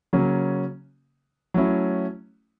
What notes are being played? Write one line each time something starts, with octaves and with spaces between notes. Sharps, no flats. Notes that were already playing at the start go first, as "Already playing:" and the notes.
C#3 F#3 A#3 C#4
F#3 A3 C#4 E4